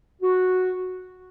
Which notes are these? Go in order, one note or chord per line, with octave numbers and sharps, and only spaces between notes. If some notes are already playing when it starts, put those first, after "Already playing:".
F#4